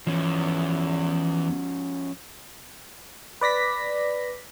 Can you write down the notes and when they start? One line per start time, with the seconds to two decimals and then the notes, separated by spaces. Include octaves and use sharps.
0.07 E2 F3 C#4
3.41 B4 D5 A#6 B6